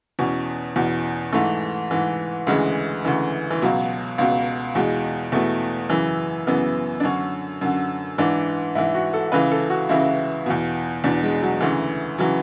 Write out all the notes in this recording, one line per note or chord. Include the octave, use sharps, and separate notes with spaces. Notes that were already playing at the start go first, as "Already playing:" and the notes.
E2 B2 C#4
E2 B2
G#2 E3 A3
G#2 E3
D2 C#3 E3 G#3
D2 C#3 E3
E3
C#2 B2 F#3
C#2 B2
E2 B2 G#3
E2 B2 A3
F#2 C#3 E3
F#2 C#3 E3 B3
D4
F#2 D3 C#4
F#2 D3
G#2 E3 D4
G#2 E3 E4
F#4
A4
C#2 C#3 E3 B4
A4
F#4
C#2 C#3 E3 E4
E2 B2
E2 B2 D4
G#3
F#3
D2 C#3 E3
C#3 E3 F#3